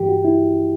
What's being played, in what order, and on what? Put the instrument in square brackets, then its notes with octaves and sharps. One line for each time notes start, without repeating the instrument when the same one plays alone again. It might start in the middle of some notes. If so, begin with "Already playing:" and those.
Already playing: [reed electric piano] G2 E3 G4
F#4
E4